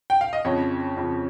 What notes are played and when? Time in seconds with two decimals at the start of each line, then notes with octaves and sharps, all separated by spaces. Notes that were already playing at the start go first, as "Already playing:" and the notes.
0.10 G5
0.21 F5
0.33 D#5
0.45 F2 C#3 F3 C#5
0.97 F2 C#3 F3